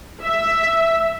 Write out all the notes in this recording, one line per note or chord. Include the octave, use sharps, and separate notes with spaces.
E5